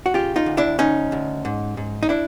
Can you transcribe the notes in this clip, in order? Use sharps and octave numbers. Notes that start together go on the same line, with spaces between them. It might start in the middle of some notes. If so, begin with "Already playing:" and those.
F#4
C#3 F4 G4
D#4 F4
D2
D4 E4
D2 C#4 D#4
D2
G#2
G#2
D#4
D4 E4